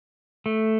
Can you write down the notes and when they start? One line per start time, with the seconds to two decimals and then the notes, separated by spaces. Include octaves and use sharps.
0.46 A3